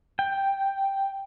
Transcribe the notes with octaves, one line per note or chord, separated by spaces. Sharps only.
G5